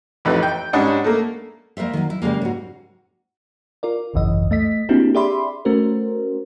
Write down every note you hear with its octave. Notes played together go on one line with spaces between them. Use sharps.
A1 F2 D#4 B4
G5
G#2 G3 C#4 D4 D#5 F#5
A3 A#3
G3 A#3 A#4 C5 E5
D#3 F#3
E4
C#3 G3 G#3 A#3
G#2 F#4
F4 A#4 D5
G#1 C#2 F#2 E3 D#5
A3 D#5 B6
A#3 C4 D4 E4 F#4 G4
G4 G#4 D5 E5 B5 C6
A3 C#4 F#4 A#4 C5